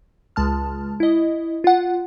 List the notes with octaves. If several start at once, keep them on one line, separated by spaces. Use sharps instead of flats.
C#2 G#3 A5 F6
E4 D#5
F4 F#5